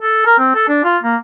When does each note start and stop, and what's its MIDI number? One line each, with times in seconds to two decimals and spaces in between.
0.01 0.23 69
0.26 0.34 70
0.39 0.51 60
0.55 0.66 69
0.68 0.83 62
0.84 0.98 65
1.03 1.16 58